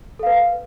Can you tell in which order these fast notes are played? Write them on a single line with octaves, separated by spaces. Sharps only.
A4 F5 B4